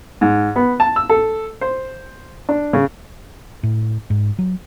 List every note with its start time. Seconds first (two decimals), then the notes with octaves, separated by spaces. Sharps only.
0.21 G#2
0.56 B3
0.80 A5
0.96 E6
1.09 A4
1.61 C5
2.49 D4
2.73 C#3
3.63 A2
4.10 G#2
4.39 F#3